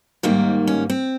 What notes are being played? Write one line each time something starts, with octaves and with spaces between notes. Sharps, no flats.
G#2 D#3 G3 A#3 C4
C#4
C4